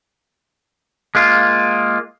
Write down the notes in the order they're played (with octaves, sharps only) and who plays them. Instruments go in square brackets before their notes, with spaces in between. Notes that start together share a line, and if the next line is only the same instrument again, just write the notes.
[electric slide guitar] G#3 A#3 F4